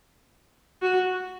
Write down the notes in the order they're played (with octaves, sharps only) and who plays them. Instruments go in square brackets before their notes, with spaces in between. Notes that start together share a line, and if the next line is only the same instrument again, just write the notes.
[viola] F#4